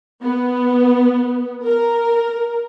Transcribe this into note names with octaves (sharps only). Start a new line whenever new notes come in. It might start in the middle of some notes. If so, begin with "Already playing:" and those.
B3
A#4